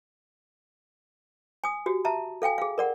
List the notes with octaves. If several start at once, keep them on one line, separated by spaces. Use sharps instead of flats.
G#5 D#6
F#4 G4
E5 A5 A#5
A4 F5 G5 G#5
G#4 F5
A#4 D5 F#5